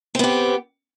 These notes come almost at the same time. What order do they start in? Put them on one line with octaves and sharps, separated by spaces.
C4 B3 G4